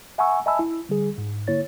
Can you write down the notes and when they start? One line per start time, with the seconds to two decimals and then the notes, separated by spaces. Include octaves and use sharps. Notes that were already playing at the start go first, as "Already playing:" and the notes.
0.18 E5 F#5 G#5 A#5 C#6 E6
0.46 D#5 E5 G#5 A5 B5 E6
0.59 E4
0.89 D3 G3 G#4
1.18 G#2
1.47 D3 A#3 E4 C#5 A6